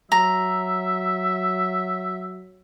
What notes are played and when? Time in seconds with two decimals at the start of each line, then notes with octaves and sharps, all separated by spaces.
0.12 F#3 E5 A#5